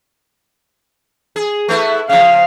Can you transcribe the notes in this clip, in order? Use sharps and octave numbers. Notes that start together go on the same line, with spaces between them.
G#4
A3 B3 E4
C#3 F3 F5